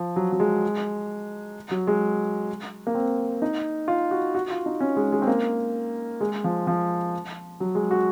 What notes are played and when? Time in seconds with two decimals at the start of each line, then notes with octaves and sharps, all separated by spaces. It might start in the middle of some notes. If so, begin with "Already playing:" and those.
Already playing: F3
0.16 F#3
0.32 F#3
0.40 G#3
1.71 F#3
1.87 G#3
2.87 A#3
2.95 C4
3.42 D#4
3.88 F4
4.11 F#4
4.35 F#4
4.50 F4
4.66 D#4
4.80 C#4
4.97 G#3
5.12 G#3
5.22 C4
5.27 A#3
6.21 G#3
6.44 F3
6.67 F3
7.60 F#3
7.75 G#3
7.91 F#4